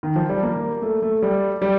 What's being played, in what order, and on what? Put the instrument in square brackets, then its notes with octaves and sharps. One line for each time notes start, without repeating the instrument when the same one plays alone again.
[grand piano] D#3
F3
G3
A#3
A3
A3
G3
G3